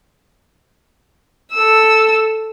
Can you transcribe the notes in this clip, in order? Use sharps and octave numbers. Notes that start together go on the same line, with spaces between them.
A4 E6